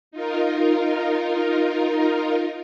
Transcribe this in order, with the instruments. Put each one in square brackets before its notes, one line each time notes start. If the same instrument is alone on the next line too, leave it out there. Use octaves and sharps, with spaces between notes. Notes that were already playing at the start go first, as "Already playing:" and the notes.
[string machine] D#4 F4 A#4